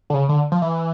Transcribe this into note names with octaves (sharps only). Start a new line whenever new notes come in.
D3
C#3
D3
F3
E3